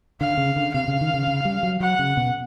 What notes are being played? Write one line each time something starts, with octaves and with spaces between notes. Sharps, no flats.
D3 F5
C#3
D3
C3 F5
C#3
D#3
C#3
C#3
G3
F#3
F#3 F#5
C#3
B2